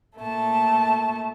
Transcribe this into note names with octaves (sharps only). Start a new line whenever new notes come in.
A#2 A3 A5